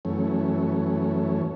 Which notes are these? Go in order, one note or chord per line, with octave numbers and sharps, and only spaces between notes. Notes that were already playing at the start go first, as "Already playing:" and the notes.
F#2 E3 A3 C#4